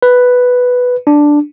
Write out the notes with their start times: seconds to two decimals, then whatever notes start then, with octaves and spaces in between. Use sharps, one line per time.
0.02 B4
1.07 D4